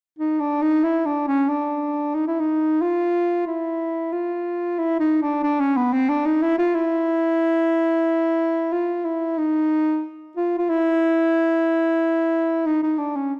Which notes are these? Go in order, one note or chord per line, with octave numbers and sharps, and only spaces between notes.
D#4
D4
D#4
E4
D4
C#4
D4
D#4
E4
D#4
F4
E4
F4
E4
D#4
D4
D4
C#4
B3
C4
D4
D#4
E4
F4
E4
F4
E4
D#4
F4
F4
E4
D#4
D#4
D4
C#4